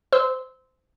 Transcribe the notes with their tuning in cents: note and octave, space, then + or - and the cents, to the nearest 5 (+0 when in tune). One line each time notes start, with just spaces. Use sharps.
C5 -20 C6 -15 E6 -25